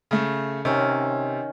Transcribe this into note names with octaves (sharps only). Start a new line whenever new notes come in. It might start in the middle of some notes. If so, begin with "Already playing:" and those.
C#3 A3
C3 D#3 C#4